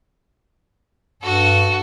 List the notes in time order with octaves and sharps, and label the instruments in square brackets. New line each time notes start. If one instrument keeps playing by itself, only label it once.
[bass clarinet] G2 [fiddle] F#4 A4